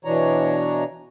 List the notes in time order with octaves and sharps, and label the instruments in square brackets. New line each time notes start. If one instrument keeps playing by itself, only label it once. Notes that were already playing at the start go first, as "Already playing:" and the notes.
[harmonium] B2 E3 D4 C#5 A#5